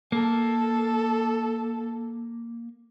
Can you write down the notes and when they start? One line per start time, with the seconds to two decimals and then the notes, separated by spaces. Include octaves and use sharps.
0.12 A#3 A4